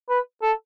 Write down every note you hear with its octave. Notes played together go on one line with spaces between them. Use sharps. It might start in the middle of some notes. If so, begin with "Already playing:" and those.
B4
A4